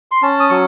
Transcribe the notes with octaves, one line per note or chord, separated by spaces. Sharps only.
C6
C#4 A5
D#6
F#3 C#6